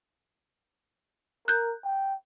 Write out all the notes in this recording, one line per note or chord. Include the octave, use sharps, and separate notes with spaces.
A#4 F#6 G6
G5